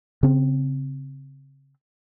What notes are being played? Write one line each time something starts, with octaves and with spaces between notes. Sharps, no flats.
C#3 C4